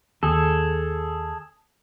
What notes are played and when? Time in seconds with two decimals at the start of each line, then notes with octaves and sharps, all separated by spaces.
0.23 D#2 G#4 A4